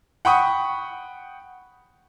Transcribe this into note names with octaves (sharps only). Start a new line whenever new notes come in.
F#5 G5 B5 C#6 D#6